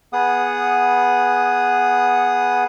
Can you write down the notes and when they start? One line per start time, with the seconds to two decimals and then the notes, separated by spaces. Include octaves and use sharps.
0.13 B3 G#4 F#5 D#6